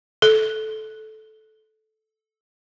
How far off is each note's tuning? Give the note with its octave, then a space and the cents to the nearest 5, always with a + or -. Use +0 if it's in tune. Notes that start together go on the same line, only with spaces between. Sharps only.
A4 -15